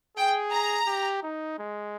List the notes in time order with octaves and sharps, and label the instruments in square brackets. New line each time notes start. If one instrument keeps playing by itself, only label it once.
[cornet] G#4 [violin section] G5
[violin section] A#5
[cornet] G4
D#4
G#3